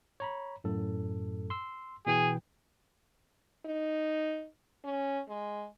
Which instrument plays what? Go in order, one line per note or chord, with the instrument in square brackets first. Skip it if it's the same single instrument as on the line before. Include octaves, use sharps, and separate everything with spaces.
[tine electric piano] C#5 A#5 B5
F#2 A2 A4
C6 E6
[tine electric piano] B2 E3 G5 [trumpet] G#4
[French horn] D#4
C#4
G#3